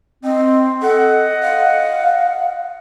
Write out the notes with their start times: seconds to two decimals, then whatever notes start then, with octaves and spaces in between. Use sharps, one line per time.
0.24 C4 D#5
0.82 A4 D#5 F#5
1.42 F5